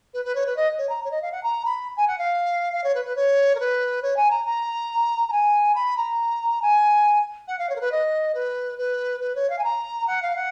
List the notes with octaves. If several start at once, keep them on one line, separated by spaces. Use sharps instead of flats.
B4
B4
C#5
B4
D#5
C#5
A#5
C#5
D#5
F5
F#5
A#5
B5
G#5
F#5
F5
F5
C#5
B4
B4
C#5
A#4
B4
C#5
G#5
A#5
A#5
A#5
G#5
B5
A#5
G#5
F#5
F5
C#5
A#4
B4
D#5
B4
B4
B4
C#5
F5
G#5
A#5
F#5
F5
F#5